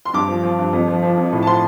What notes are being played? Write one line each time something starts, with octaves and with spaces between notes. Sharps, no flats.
C6
G2 D6
F3
F3
G2
F2
F3
F3
F2
A2
A5
F3 C6